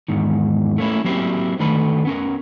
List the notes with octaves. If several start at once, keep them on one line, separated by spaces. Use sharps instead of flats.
E2 G#2 D#3
A3 A#3 C#4 E4
F#3 A#3 C4 E4 G4
D3 D#3 A3 A4 B4 B5
B3 C#4 A#4